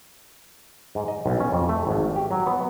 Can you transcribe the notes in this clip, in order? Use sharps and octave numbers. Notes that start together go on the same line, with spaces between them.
G#2
D#5
B1
C#4
F2
A3
G#1
G4
F#3
B3